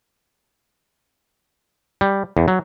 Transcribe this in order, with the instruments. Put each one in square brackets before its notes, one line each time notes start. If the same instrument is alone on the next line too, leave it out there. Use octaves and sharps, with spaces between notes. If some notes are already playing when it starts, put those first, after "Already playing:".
[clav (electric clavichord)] G3
E2
F#3